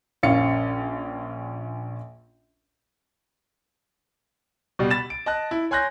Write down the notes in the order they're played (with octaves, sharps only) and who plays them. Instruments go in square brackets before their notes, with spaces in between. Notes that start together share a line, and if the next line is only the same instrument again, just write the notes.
[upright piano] A#1 C#4 F5 C#7
[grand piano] B2 G3
B5 A6 E7
D7
D#5 A5 F#6
E4
C#5 G#5 C6 F#6 G6 A#6